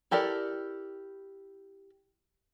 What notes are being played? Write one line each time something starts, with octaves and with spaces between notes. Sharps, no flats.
E4 G4 A4 A#4 D5